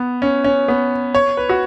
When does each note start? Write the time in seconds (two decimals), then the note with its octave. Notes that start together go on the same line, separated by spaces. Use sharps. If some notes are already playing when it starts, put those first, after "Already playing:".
Already playing: B3
0.22 C#4
0.44 C#4
0.68 B3
1.15 C#5
1.37 B4
1.49 F#4